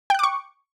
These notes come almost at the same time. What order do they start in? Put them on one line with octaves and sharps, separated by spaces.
G5 F#6 D6 C#6